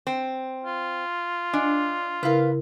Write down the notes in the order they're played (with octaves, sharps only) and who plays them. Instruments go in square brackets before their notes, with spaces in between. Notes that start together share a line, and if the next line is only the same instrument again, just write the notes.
[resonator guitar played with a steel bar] C4
[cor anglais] F4
[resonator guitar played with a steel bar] D4 [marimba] D#5 G#5
[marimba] C#3 E4 A#4 [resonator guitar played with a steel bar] B4 F5